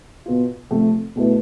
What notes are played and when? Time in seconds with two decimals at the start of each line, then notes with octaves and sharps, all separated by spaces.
0.26 B2 B3 F4
0.71 C3 F3 A3
1.16 B2 A3 E4 B4